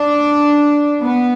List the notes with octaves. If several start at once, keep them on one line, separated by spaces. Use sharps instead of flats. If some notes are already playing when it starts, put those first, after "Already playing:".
Already playing: D4
B3